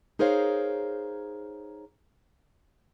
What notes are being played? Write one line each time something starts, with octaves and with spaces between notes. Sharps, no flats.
D#4 G#4 A#4 C5 C#5 F5